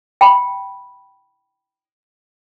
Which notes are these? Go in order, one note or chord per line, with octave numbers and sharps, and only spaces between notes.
G5 B5